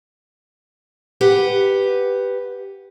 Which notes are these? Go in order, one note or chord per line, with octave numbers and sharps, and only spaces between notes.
G4 B4 F#5